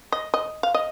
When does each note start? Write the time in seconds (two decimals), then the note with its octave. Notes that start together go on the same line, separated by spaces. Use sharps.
0.12 D#5
0.34 D#5
0.63 F5
0.74 D#5